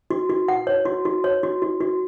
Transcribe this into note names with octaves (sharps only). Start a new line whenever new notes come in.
F#4
F#4
F#5
C#5
F#4
F#4
C#5
F#4
F#4
F#4